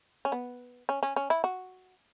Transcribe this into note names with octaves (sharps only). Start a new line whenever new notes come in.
C#4
B3
C#4
C#4
C#4
E4
F#4